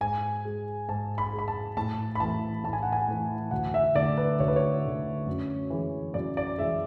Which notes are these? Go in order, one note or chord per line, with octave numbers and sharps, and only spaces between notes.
G#2 G#5
G#3
G#2 A5
B5
G#3
B5
A5
A2 A5
B5
E3 A3 A5
A2 A5
G#5
F#5
G#5
E3 A3
D2 F#5
E5
D3 A3 D5
B4
D2 C#5
B4
C#5
D3 A3
F#2
E3 G#3
F#2 D5
D5
E3 G#3 E5